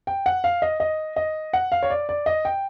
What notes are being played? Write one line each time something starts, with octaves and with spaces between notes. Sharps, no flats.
G5
F#5
F5
D#5
D#5
D#5
F#5
F5
C#5
D5
D5
D#5
G5